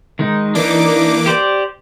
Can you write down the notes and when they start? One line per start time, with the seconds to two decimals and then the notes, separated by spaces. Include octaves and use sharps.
0.19 D#3 G#3 D#4
0.55 E3 A#3 D4 D#4 D6
1.26 G4 C5 D5